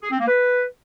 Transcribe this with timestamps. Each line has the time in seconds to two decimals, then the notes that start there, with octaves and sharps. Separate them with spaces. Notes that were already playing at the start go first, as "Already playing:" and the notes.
0.03 G#4
0.11 C4
0.20 A#3
0.28 B4